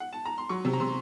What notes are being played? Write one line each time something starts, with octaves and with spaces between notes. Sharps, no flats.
F#5
A5
A#5
C6
F#3 C#6
C3
A#5
C3 C6